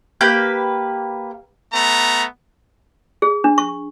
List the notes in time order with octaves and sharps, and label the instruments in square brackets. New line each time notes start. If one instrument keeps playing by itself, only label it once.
[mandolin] A#3 G4 B4 G6
[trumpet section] A3 B3 A#5
[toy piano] G#4
D4
C#6